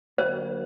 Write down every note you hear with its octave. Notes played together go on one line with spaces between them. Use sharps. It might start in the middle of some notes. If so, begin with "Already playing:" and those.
D3 F#3 A#3 C5